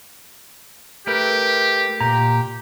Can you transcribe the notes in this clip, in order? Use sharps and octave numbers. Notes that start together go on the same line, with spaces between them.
A3 G4 A#4 B4
A#2 G4 A#5